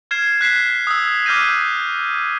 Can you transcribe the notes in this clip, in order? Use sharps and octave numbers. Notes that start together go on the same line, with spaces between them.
F6 G#6 C7 E7
F#6 B6 C7 E7
D#6 E6
D6 F6 G6 A#6 D#7